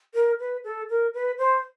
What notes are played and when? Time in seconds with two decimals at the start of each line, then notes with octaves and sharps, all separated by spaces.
0.14 A#4
0.40 B4
0.64 A4
0.90 A#4
1.14 B4
1.38 C5